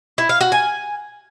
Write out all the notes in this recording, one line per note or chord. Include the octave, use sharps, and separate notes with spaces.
E4
F5
F#4
G#5